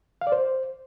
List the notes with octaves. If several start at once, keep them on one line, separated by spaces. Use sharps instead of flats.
F5
D5
C5